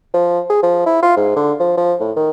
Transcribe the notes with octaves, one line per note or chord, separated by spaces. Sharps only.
F3
G#4
F3
E4
F4
G#2
D3
F3
F3
A2
D#3